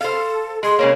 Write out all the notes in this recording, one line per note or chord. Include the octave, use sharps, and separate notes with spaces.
A4 C5 F5
G#3 G#4 C6
C#3 G#3 A#3 C#5